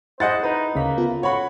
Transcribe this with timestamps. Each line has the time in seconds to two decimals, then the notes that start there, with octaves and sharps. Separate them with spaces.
0.20 E4 G#4 C5 D#5 F#5 A6
0.43 D#4 B4
0.76 D2 C#3 A#3 E5 B6
0.98 B3 F4 A4
1.23 F#4 C#5 B5